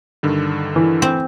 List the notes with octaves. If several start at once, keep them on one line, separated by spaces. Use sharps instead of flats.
G2 D3 D#3
E3
C4